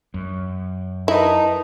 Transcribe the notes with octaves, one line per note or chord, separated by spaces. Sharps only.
F#2
D#4 E4 A#4 B4 A5